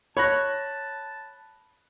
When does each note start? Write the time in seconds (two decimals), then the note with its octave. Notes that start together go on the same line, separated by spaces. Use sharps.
0.17 C#5 A5 B5 F#6 A#6